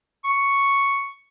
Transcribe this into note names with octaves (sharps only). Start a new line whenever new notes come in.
C#6